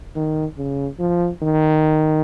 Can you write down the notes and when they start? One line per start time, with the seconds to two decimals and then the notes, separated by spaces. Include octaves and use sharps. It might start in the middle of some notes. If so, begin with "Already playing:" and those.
0.16 D#3
0.57 C#3
0.99 F3
1.42 D#3